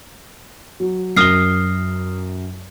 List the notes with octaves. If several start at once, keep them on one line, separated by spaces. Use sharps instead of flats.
F#3
F#2 D#6 F6 A#6 C7 G7